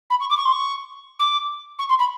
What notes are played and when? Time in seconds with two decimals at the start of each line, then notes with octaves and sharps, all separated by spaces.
0.10 B5
0.20 C#6
0.30 D6
0.37 C#6
0.45 C6
0.52 C#6
1.19 D6
1.79 C#6
1.89 C6
1.99 B5